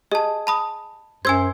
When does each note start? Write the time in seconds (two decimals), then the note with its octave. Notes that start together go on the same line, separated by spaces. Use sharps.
0.12 G#4 D#5 A5
0.47 A5 B5 D#6
1.25 F#2 C5 G#5 E6 G#6